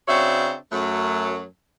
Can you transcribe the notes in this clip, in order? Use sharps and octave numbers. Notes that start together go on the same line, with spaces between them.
C#3 C4 D4 F#4 C#5 E5
F#2 F#3 A3